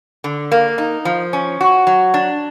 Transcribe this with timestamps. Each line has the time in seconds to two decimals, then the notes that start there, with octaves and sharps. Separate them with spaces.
0.24 D3
0.52 A#3
0.78 D#4
1.05 F3
1.33 C#4
1.61 F#4
1.87 F#3
2.14 D4